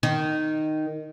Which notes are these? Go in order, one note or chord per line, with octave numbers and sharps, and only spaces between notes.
D#3